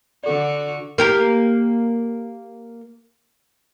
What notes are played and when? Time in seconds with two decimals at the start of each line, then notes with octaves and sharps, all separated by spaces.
0.24 D3 F#4 A4 D5
0.98 A#3 G4 A#4